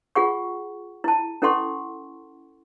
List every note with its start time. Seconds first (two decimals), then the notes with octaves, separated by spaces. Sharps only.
0.15 F4 G#4 F#5 C#6
1.04 E4 A5
1.42 C#4 E4 A4 F#5 C6 C#6